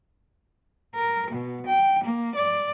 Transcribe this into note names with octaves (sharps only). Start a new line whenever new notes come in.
A#4
B2
G5
A#3
D5